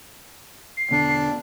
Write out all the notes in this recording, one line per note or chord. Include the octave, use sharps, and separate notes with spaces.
C7
E1 D3 B3 D4